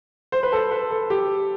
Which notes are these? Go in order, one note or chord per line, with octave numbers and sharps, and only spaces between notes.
C5
B4
A4
B4
A4
G4